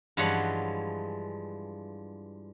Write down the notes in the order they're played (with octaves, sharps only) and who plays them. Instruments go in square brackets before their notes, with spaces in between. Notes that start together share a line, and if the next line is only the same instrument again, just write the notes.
[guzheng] G2 E3 F3 G#3 C#5 F#5